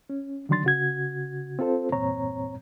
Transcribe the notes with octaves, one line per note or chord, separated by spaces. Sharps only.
C#4
D3 D#3 F#3 D4 C6 A6
C#3 F#4 G#6
C4 F4 A4 C5
E2 G2 A#2 C4 C#5 A#5